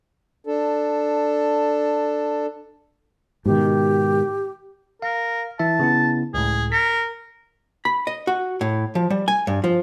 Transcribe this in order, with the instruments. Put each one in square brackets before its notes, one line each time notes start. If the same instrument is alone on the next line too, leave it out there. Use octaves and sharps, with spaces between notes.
[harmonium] D4 A4
[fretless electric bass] G#2 B2 D#3 [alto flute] G4
[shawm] A#4 [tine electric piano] F5
[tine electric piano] E3 E4 E5 [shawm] A5
[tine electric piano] C#3 B3 E4
[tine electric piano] C#2 A2 [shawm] G#4
[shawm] A#4 [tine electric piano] B6 C#7
[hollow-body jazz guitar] B5
D#5
F#4
A2
F3
G3
G#5
G2
F3